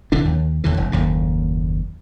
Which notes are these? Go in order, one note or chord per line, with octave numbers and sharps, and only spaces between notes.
C2 D3 E3 D4
D#2
D#2 D3 E3
E1
F#1 D#2 A2